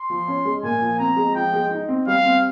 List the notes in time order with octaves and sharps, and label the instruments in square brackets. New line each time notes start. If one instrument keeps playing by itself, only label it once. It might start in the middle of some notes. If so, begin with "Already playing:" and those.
Already playing: [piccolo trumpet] C6
[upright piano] F3
C#4
G#3
[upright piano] A#2 [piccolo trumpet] G#5
[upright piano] F3
[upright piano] C4 [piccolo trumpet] A#5
[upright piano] G#3
[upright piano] F3 [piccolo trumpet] G5
[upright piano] G#3
D#4
C4
[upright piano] G3 [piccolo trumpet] F5
[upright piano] C4